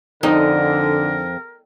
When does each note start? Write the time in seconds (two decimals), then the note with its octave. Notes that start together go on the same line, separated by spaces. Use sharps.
0.23 F2 D3 D#4 A#4